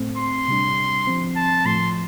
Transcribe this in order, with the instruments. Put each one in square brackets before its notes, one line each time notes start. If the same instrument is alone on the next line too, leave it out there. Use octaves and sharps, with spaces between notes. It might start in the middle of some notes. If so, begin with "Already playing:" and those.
Already playing: [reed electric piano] A2 A3 C4
[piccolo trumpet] C6
[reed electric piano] C3 G3 D4
F3 C4
[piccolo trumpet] A5
[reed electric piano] A2 F3 A3 [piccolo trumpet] C6